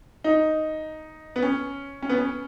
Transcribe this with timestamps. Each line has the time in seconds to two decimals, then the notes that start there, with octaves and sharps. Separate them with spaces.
0.24 D#4
1.36 B3
1.42 C#4
2.02 C#4
2.09 B3
2.17 C#4